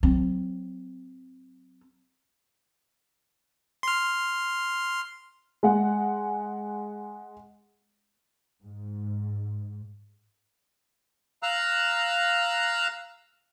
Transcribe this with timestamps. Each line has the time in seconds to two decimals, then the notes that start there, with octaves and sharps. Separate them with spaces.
0.03 F#3 C4
3.83 C6 F6
5.63 G#3 F#5
8.63 G#2
11.43 F5 A#5 E6 F#6